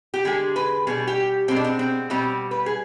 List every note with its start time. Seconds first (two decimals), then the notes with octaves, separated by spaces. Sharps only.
0.14 G4
0.25 D3 G#3 G#4
0.56 B4
0.87 B2 G3 G#4
1.07 G4
1.48 B2 G#3 C4
1.56 D4
1.65 C4
1.79 C4
2.10 B2 G3 C4
2.51 B4
2.66 G#4